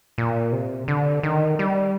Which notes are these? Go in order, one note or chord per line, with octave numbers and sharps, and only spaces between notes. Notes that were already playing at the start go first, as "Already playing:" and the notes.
A#2
C3
D3
D#3
G3